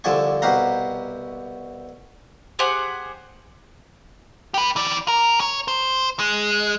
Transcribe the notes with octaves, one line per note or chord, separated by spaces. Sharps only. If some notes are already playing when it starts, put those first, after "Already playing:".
C2 D3 F3 D5 G#5 C#6
C2 B2 G4 F5 F#5 A#5
G4 G#4 C5 F#5
G4 B4
E3 D5
A#4
C#5
C5
G#3